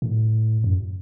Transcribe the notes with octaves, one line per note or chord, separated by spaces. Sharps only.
A2
F#2